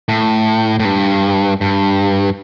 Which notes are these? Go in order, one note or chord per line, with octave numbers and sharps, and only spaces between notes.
A2
A2
G2
G2